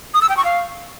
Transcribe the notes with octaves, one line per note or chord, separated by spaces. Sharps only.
D#6
E6
G5
C#6
F5